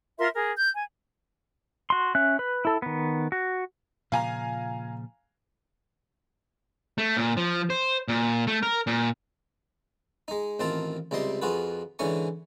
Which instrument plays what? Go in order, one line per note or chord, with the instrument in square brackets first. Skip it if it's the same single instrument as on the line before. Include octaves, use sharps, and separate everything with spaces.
[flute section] F4 A#4 E5 C6
G#4 A#4
G6
G#5
[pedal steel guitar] F#4 C6
C#4 E5 F#6
B4
E4 A4
D#3 B3
F#4
[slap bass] A#2 C#3 F3 [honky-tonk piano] F5 G#5 A#5
[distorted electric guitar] A3
A#2
F3
C5
A#2
A3
A#4
A#2
[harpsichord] G#3 D#4
A1 D#3 C4 F4 A5
C#2 C3 G3 D#5 C6
F2 F4 F#4 G#4 B4
G#2 D3 E3 C#4 G#5 C#6